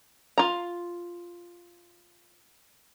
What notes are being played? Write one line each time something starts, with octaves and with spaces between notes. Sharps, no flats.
F4 A#5